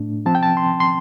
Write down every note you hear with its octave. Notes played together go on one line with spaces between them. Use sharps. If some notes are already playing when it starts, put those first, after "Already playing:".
Already playing: A2 A3 D4
F3 C4 A5
G5
A5
C6
C6